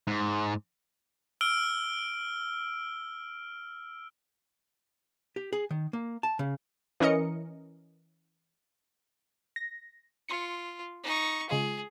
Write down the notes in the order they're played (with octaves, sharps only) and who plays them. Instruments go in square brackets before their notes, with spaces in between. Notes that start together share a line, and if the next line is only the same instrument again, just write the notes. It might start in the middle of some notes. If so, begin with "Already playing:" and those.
[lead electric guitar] G#2
[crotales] E6 F6 D7 G7
[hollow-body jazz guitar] G4
G#4
D#3
A#3
A5
C#3
[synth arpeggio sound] E3 C#4 A#4 D#5 C#7
[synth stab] A#6
[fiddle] F4 [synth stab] C6 C#7
[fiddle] D#4 C#6
[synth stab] C#3 G#3 F4 [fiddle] G#4